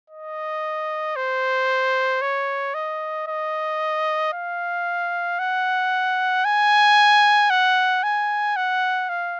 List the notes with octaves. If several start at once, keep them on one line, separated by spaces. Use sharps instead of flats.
D#5
C5
C#5
D#5
D#5
F5
F#5
G#5
F#5
G#5
F#5
F5